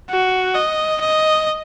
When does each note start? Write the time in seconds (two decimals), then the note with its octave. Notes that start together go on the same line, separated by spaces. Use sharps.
0.10 F#4
0.55 D#5
1.01 D#5